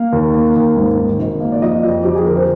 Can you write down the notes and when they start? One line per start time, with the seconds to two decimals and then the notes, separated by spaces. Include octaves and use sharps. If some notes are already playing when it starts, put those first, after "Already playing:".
Already playing: A#3 F5
0.13 D#2
0.34 A#3
0.56 D#2
0.77 G#2
0.98 D#3
1.19 G#1
1.40 A#3
1.52 D5
1.62 F2 D#5
1.84 F2
2.03 F2 G4
2.15 G#4
2.25 D3 A#4
2.36 C5